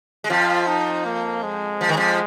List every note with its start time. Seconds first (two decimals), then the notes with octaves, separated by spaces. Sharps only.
0.24 G#3
0.30 F2 F3 F4
0.67 D#4
1.05 A#3
1.43 G#3
1.81 F3
1.89 D#3
1.97 F2 F3